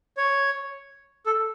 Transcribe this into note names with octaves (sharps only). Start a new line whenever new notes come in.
C#5
A4